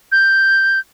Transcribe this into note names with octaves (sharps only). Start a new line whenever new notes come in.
G6